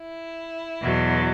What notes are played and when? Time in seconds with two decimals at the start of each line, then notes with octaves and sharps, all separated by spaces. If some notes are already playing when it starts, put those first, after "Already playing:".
Already playing: E4
0.81 E2 B2 F#3